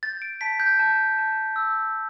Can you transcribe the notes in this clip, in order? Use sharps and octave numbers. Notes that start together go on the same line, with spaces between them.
G6 A6
D7
A5 B6
G6
A5
A5
E6